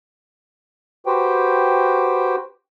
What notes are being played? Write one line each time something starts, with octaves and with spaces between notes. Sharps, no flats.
F#4 G4 B4 C5 G5